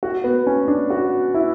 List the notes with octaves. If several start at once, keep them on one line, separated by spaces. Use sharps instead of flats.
F#4
B3
C#4
D4
F#4
E4